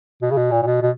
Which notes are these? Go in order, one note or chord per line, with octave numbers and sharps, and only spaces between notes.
B2
C#3
B2
A#2
A#2
B2
B2